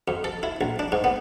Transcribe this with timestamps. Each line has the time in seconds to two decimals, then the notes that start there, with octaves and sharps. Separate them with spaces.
0.08 F2
0.24 A4
0.43 E4
0.61 A#1
0.79 D4
0.92 G#2
1.04 B3